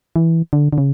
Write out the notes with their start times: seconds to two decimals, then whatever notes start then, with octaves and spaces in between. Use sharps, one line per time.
0.16 E3
0.53 D3
0.73 D3
0.78 C#3